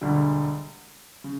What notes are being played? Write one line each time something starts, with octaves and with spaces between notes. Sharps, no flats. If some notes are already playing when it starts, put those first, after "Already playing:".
E1 D2 D3 G3
C#3